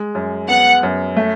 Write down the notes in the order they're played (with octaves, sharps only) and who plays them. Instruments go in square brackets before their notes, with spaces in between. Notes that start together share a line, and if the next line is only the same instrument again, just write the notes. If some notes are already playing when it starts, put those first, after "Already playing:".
Already playing: [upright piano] G#3
F#2
[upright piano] B3 [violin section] F#5
[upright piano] F#2
A3